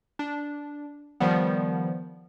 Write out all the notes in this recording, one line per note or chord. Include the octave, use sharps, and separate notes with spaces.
D4
D#3 F3 G3 B3